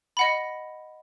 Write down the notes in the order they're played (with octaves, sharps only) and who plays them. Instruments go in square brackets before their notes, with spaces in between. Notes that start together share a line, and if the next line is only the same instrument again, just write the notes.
[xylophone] D#5 F#5 B5